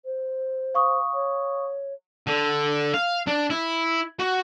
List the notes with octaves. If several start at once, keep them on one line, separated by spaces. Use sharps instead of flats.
C5
F5 C#6 D#6
C#5
D3
F5
D4
E4
F#4